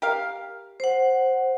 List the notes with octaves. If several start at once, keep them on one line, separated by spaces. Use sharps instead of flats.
G4 A#4 F5
C5 F#5